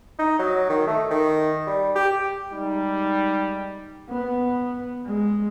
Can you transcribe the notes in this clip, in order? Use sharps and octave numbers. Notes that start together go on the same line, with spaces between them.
D#4
F#3
D#3
A3
D#3
G3
G4
G3 G#3 D#4
B3
G#3